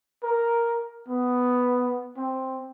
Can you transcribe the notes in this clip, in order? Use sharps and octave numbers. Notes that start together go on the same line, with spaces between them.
A#4
B3
C4